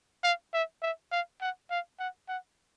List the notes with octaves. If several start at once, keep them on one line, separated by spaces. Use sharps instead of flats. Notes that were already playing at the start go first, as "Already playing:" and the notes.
F5
E5
E5
F5
F#5
F5
F#5
F#5